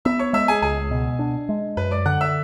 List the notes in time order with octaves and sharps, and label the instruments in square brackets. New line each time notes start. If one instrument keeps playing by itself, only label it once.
[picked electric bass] B3 [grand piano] E5 E6
[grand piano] C#5 C#6
[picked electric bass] G#3 [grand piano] E5 E6
[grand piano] G#4 G#5
[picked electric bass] C#2 [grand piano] G#4 G#5
[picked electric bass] B2
D4
G#3
[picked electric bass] F#2 [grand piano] B4 B5
[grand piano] D5 D6
[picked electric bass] D3 [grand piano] F#5 F#6
[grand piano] E5 E6